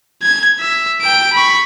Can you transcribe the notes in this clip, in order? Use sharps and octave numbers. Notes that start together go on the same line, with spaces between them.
G#6
E5
G5 D7
B5 C#6